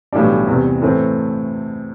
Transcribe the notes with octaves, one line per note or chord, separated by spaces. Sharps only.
B1 A2 E3 G3 D4
E2 C3 E3 G3
A2 E3 A3 C4